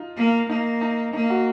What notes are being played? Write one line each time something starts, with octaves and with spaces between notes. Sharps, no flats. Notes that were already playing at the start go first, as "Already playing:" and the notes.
Already playing: D#4 F4
A#3
A#3 D#4
D#4
A#3 D#4
F#4